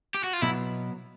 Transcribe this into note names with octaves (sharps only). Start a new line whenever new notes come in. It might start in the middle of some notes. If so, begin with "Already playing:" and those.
G4
F#4
F4
B2 F#3 B3 E4